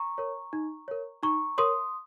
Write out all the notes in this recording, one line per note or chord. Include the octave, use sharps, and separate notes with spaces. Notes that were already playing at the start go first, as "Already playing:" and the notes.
Already playing: A#5 C#6
A#4 C#5
D#4
A#4 C#5
D#4 A#5 C#6
A#4 C#5 C6 D#6